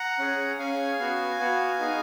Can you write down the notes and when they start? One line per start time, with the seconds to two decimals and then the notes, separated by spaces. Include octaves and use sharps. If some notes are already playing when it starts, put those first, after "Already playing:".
Already playing: F#5 A#5
0.19 C#4 G#4
0.59 C#4 G#4 F5 G#5
0.99 B3 F#4
1.40 B3 F#4
1.78 B3 D#4 G#4